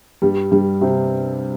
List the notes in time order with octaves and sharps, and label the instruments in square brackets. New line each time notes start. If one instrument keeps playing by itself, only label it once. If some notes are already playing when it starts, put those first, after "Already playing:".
[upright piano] G2 G3
G2 G3
C3 C4